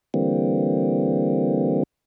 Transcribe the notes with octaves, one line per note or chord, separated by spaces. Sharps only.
D3 E3 G3 A#3 C4